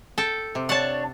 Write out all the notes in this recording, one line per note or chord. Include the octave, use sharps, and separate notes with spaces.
A4 G5
C3
D4 C#5 F#5 A5